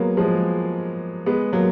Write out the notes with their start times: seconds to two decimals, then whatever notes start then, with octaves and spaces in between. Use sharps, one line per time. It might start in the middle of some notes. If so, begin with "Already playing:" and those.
Already playing: F#3 G#3 A#3 B3
0.17 F3 G#3
1.26 G#3 B3
1.53 F#3 A#3